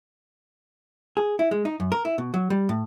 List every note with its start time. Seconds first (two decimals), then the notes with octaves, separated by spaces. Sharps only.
1.17 G#4
1.39 E4
1.51 G#3
1.65 D#4
1.80 F#2
1.92 A#4
2.05 E4
2.18 B2
2.34 F#3
2.50 G3
2.69 A2